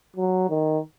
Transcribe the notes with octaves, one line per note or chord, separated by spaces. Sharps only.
F#3
D#3